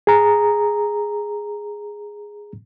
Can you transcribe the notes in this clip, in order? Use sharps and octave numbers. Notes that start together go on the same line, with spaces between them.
G#4 A#5